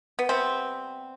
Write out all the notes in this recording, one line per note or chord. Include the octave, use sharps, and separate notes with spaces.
B3
C3 G3 B3 C4